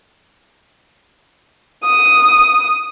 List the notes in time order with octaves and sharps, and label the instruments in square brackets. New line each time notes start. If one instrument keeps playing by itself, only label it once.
[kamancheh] D#6